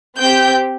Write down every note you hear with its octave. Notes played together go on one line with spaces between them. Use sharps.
C4 G4 G5 G6